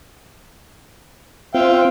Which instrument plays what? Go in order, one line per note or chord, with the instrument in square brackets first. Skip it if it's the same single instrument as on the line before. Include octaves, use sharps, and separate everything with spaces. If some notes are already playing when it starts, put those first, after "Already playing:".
[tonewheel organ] C4 F4 [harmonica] E5 F5 G5